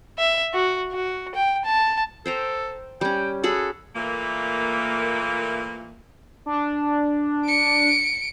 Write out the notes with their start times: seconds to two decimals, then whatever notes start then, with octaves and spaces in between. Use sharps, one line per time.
0.19 E5
0.54 F#4
0.92 F#4
1.35 G5
1.65 A5
2.26 A4 C5 G5 A#5
3.01 G3 C#4 G5
3.44 F#4 G#4 A4 B5
3.96 A#2 E3 A3 A#3
6.46 D4
7.45 C#7 D7